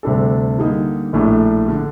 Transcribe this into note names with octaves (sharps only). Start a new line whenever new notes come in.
D2 C3 G3 D4 A4
D3 G3 A#3 D#4
A#1 A2 A3 D4
D3